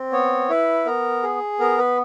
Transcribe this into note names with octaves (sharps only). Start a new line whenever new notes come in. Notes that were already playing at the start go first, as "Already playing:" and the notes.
Already playing: C4
B3 C#5
E4 B4
B3 A#4
G#4
B3 A#4
B4